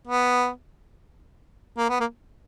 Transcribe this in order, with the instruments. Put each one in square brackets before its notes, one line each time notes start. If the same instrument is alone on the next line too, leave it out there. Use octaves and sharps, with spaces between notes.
[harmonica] B3
A#3
B3
A#3